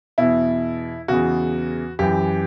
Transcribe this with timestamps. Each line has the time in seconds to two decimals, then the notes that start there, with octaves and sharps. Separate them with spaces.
0.18 E2 B2 E4
1.08 E2 C#3 E3 F#4
1.99 F#2 E3 G4